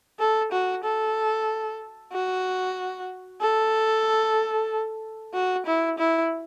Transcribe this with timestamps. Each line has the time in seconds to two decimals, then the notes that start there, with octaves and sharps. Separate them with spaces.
0.19 A4
0.52 F#4
0.84 A4
2.13 F#4
3.41 A4
5.34 F#4
5.66 E4
5.99 E4